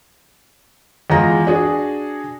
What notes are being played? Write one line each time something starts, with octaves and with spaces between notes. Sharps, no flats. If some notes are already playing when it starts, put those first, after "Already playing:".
E2 G#3 F4 A#5 A#6
D4 F#4 G#4